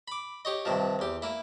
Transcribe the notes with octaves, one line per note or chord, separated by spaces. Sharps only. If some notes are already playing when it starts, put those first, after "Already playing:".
B5 D6
G4 C#5 D#5
G2 C3 D#3 F3
E2 G4
A#3 E4